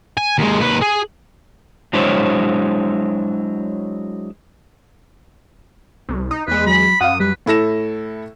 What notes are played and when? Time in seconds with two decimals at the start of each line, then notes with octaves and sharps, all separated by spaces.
0.17 G#5
0.38 D#2 G#3
0.59 D#2 B4
0.81 G#4
1.93 F#3 G#3 D4 E4 C5 C#5
6.09 C2
6.31 D#4
6.47 E2 G#3 B4
6.67 F#3 B5
7.01 F#2 F5 F#5 D#6
7.20 G3 B4
7.46 A2 E4 A4 A#6 E7